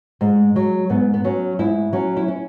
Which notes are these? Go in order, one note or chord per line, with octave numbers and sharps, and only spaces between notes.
G#2 G#3
F#3
G#2 B3
B3
F#3 C#4
G#2 E4
F#3 C#4
E4
C#4